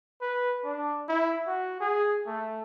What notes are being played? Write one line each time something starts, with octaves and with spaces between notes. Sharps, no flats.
B4
D4
E4
F#4
G#4
A3